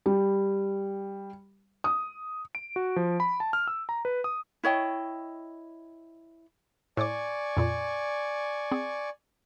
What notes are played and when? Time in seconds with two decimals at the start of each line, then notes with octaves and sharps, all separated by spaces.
0.06 G3
1.84 D#6
2.55 D7
2.76 F#4
2.96 F3
3.20 B5
3.40 A5
3.53 F6
3.67 E6
3.89 A#5
4.05 B4
4.24 D#6
4.64 E4 C#5 D#5 G5
6.97 A2 D5 G#5 C#6 D6
7.57 F2 A#2
8.72 C4 G#4